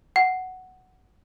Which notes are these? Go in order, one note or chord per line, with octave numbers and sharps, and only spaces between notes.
F#5